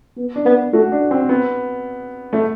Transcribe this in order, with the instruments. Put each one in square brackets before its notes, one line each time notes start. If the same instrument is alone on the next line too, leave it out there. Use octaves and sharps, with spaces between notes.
[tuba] B3
[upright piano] D4
[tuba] B3
[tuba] A3 [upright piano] F#4
[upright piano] D4
C4
B3
A3